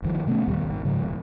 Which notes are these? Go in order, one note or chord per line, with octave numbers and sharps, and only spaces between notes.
F1 G2 D#3 F3
C3 A3 B3 C#4
D#2 A#2 D#3 G3
G#1
G#2 C#3 F3 G#3
E1